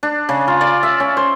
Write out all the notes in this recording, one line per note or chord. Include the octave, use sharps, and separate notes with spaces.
D4
C#3
F4
D5
E5
C#4
C5